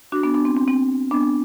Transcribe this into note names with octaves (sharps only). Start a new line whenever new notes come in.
D4 F#4
B3 D4
B3 D4
C4
C4
C4
B3 D4